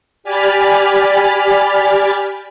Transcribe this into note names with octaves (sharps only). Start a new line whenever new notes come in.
G4 D5 G#5 B5 F6 A6